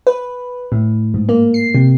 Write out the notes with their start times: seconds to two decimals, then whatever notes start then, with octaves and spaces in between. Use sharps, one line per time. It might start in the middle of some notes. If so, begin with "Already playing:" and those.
0.07 B4
0.72 A2
1.14 G#2
1.29 A#3
1.54 C7
1.75 C3